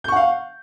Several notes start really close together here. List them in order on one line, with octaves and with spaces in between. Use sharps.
G6 C#6 F#5 F5